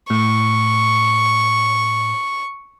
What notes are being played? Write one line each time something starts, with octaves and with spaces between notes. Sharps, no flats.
A2 C#6